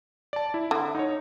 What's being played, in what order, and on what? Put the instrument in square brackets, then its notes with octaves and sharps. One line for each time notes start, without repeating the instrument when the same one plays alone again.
[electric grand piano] D5 A5
E4
[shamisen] D3
[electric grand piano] D#4 C#5